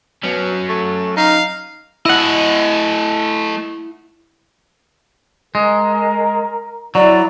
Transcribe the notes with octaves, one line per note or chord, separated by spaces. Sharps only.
B2 F#3 C#4
A3
D#4 F5
A3 E4 D#5 F#5
G#3 A#4
F#3 E4 D5